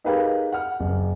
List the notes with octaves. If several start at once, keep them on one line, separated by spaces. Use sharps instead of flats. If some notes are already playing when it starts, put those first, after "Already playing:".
D#4 G4 G#4 A#4 B4 F5
F#5 F6
F#1